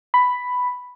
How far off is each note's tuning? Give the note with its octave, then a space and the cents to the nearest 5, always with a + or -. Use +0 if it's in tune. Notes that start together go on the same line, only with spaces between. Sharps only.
B5 +5